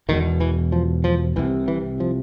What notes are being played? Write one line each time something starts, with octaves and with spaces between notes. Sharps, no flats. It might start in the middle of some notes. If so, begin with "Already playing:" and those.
E1 E2 B2 D#3
E3
F3
F3
C2 C3 E3
E3
F3